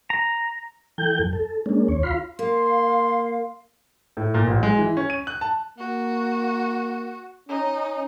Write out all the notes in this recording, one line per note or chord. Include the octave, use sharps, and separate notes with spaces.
A#5
E3 A4 G5 G6
F#2
A4
G#3 A#3 C#4 D4
D#2 C#5
F4 F5 B5 C6
A#3 F5 C6
A2
A#2
A1
G#3
E3
C#4
D#7
F#6
A5
A#3 F#4
C#4 D#4